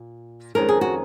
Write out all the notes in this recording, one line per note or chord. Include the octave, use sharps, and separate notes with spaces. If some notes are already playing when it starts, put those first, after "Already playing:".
Already playing: A#2
F2 D#3 G#3 C#4 A#4
G#4
F#4